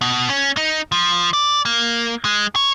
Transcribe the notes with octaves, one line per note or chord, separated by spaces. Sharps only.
B2
C#4
D#4
F3
D5
A#3
G#3
C#5